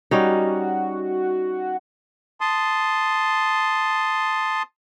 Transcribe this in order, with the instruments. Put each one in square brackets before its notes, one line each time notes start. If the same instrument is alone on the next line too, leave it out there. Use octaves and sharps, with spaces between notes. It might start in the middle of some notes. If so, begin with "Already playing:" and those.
[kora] G3 C#4 D#4 [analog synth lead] F#4
[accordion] A5 C6 D#6